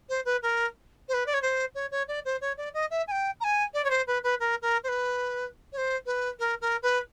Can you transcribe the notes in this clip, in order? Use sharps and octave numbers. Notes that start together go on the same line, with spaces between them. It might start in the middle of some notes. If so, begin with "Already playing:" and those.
C5
B4
A#4
C5
B4
D5
C#5
C5
C#5
C#5
D5
C5
C#5
D5
D#5
E5
G#5
G5
A#5
G#5
D5
C#5
C5
B4
B4
A#4
A#4
C5
B4
C#5
C5
B4
A#4
A#4
B4